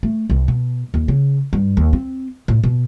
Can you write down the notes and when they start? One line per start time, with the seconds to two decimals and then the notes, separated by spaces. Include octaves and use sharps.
0.03 A3
0.30 C2
0.48 B2
0.94 D#2
1.08 C#3
1.53 G2
1.77 D#2
1.93 C4
2.48 A2
2.63 B2